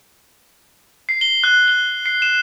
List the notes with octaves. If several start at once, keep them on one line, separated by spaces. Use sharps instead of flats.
C7
G7
F#6
G7
C7
E7